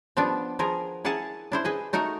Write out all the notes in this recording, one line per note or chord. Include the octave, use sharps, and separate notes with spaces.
F3 G3 B3 D4
F3 B3 G#4 A#4
E4 G#4 A#4 F#5 G#5 A5
D4 E4 C5
G#4 B4 D#5
A3 D#4 F#4 A#4